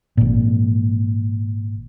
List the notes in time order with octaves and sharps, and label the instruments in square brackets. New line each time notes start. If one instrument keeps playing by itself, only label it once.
[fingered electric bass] G#1 A#2